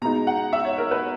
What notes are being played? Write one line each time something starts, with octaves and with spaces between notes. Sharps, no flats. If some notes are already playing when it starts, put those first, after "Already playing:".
B2 G#3 B3 D#4 A#5
F#5
E5
C#5
A#4
B4